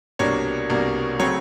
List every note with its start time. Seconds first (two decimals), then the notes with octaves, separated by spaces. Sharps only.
0.19 C2 B2 G3 A#3 D4 C#5
0.70 C2 B2 G3 A#3 D4
1.19 C#3 F#3 A3 C4 C#5